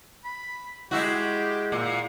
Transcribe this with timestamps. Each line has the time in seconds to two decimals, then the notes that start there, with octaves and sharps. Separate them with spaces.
0.25 B5
0.91 G#3 E4 F#4 G4
1.72 A#2